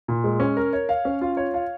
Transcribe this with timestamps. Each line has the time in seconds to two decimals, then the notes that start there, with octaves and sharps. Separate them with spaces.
0.08 A#2
0.24 G#3
0.40 C#4
0.57 A#4
0.73 C#5
0.89 F5
1.05 C#4
1.21 F4
1.37 C#5
1.54 F5